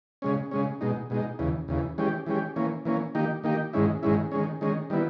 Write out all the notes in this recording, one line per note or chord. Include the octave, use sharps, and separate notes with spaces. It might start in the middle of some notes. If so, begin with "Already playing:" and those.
C#3 G#3 C#4
C#3 G#3 C#4
B2 G#3 D#4
B2 G#3 D#4
D#2 C#3 E3
D#2 C#3 E3
E3 G#3 C#4 G4
E3 G#3 C#4 G4
E3 A#3 C#4
E3 A#3 C#4
D#3 A#3 D#4 G4
D#3 A#3 D#4 G4
G#2 D#3 G#3 C#4 E4
G#2 D#3 G#3 C#4 E4
D#3 G#3 C#4
D#3 G#3 C#4
D#3 G3 B3 E4